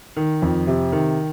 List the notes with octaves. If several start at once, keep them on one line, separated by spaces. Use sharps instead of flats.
D#3
F2
C3
D#3